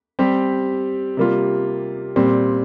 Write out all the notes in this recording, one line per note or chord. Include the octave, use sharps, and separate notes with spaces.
G3 C4 G4
C3 G3 A#3 F4
A#2 G3 C4